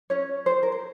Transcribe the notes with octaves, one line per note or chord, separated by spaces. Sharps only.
C#4 C#5
C5
A#4
C5